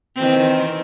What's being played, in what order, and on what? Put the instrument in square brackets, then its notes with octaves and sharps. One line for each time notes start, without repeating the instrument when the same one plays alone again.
[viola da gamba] D#3 E3 C4